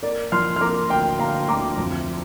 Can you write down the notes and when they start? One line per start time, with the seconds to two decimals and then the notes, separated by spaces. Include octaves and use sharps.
0.03 A#3 D5
0.32 F3 C6 F6
0.56 F6
0.61 A#3 A#5 D6
0.90 D2 G5 C6
1.19 D2 F5 A#5
1.48 D2 A#5 D6
1.78 F2